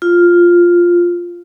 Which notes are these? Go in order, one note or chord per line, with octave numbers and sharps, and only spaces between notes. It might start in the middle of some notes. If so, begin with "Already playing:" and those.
F4